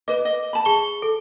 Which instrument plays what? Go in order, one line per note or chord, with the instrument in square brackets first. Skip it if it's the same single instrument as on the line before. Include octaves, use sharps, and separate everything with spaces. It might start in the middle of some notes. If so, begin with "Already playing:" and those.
[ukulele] B4 D#5 [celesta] D6
[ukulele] D#5
A5 B5
[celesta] G#4 G7
A4